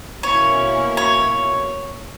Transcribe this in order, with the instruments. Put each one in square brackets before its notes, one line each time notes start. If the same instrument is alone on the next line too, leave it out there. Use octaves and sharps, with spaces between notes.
[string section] B2 A#3 C#4 E4 [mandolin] C#5
[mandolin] C#5